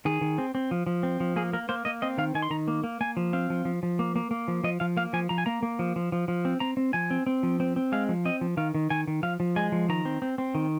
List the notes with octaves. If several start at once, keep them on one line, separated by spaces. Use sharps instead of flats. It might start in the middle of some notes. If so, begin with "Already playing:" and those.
D#3 G#4
D#3
C4
C4
F3
F3
C4
F3
A#3 G#4
A#3 A#4
A#3 C5
A#3 D#5
C4 D#5
D#3 F5
D#3 G#5
C6
D#3 A#5
A#3
A#3
A#3 G#5
F3
C4 F5
F3
F3
F3
A#3
A#3
A#3
F3
F3 D#5
F3 F5
A#3 F5
F3 G#5
F3 A#5
G#5
A#3 A#5
A#3
F3
F3
F3
F3
C4
C4 A#5
C4
F3 G#5
C4
C4
F3
C4
C4
G#3 F5
F3
C4 D#5
F3
D#3 F5
D#3
D#3 G#5
D#3
F3 F5
F3
G#3 G#5
F3
D#3 A#5
C4
C4
C4
D#3